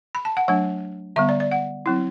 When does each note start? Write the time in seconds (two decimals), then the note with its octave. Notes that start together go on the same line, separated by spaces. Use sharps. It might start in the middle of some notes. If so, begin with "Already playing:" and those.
0.15 B5
0.25 A5
0.37 F#5
0.48 F#3 A3 D4 F#5
1.16 D3 G3 B3 E5
1.29 D5
1.40 D5
1.51 F#5
1.86 F#3 C4 E4